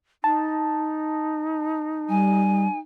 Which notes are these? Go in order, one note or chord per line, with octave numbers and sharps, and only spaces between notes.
D#4 A5
G3 G#5